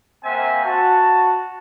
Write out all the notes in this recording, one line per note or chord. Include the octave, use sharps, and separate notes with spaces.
A#3 C4 C5 E5 F#5 G#5
F#4 A5